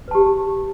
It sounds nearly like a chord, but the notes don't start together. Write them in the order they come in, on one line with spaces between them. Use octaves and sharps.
B4 A5 G4